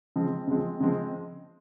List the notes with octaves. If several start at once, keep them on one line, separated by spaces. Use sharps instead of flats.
C#3 F3 G#3 C4
C#3 F3 G#3 C4
C#3 F3 G#3 C4